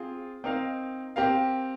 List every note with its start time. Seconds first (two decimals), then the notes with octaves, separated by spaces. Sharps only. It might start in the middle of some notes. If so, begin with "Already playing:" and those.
Already playing: C4 F4 G#4
0.44 C4 D#4 A#4 F5
1.16 C4 G4 A#4 F5